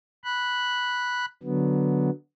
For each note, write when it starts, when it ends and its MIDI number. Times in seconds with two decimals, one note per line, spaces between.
0.24 1.25 83
0.24 1.25 90
1.43 2.10 50
1.43 2.10 54
1.43 2.10 59